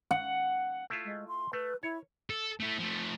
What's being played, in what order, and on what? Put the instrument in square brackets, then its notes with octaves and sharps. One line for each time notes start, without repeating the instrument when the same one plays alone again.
[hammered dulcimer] F#5
[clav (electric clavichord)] A3 E4 F4
[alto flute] G#3
C6
[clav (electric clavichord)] A3 [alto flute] B4
[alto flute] E4 [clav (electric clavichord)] C#5
[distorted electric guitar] A4
A3 E4
F3 A3